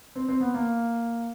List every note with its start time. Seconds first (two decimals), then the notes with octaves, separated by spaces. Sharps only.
0.16 C4
0.29 C4
0.40 B3
0.54 A#3